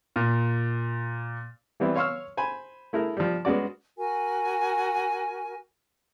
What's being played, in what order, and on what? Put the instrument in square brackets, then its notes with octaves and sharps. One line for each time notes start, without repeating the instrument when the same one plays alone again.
[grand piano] A#2
[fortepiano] E3 G3 B3 C4 E4
C#5 F5 C6 C#6 E6 F6
C5 G#5 B5
A3 E4 G#4 A#4
F3 G3
G#3 B3 C#4 F#4 D5
[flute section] F#4 A#4 G#5